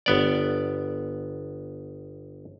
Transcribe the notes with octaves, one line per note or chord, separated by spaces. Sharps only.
G1 B3 D5